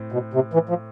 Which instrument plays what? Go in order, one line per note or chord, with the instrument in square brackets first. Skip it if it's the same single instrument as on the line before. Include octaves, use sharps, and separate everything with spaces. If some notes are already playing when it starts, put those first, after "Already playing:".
Already playing: [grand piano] A2 C4
[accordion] B2
C3
E3
F3